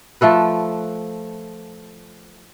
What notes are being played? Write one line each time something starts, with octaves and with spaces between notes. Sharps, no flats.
F3 A3 A4 B4